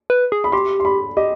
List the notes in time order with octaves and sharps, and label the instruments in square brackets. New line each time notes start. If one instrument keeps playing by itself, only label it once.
[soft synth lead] B4
G#4
[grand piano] B5
[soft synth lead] G4 [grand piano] C6
[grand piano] C6
B5
[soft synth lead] G4 [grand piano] D#5